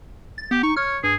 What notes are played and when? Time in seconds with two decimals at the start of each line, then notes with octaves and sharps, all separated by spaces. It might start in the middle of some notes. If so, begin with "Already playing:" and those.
0.38 A6
0.51 B3 G4
0.63 D#4 C#6
0.77 C#5 F6
1.04 G2 G#4